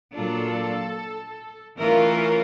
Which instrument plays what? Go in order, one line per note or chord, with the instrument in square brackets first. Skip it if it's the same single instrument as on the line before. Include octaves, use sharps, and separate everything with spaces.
[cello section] A#2 F#3 A#3 D4 F4 A4
E3 A3 C#4 F4 A#4